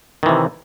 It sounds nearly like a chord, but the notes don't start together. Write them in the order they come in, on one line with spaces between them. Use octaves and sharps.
D#3 E3 C3